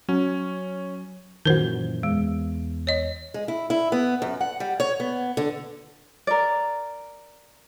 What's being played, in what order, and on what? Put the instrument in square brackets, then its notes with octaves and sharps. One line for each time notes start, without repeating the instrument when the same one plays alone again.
[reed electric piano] F#3 [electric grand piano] C#4
[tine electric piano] F#2 A#2 E3 [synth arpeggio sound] D#3 F#4 [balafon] A#4 C5
[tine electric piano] E2 [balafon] G#3
[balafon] C#5 D#5
[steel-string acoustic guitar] G#3
E4
E4
B3
F#2
F#5
G3
C#5
B3
D3
[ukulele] A#4 D5